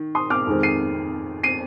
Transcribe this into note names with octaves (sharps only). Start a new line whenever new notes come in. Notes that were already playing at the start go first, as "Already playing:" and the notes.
Already playing: D#3
C6 D#6
D6 F6
F2 D#3 G#3 C4
C7 D#7
C7 D#7